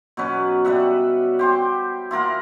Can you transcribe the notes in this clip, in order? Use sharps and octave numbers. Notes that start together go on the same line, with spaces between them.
B2 F#3 C#4 B4
G3 B4 E5 F#5
G4 C5 G5
E4 F4 A#4 F#5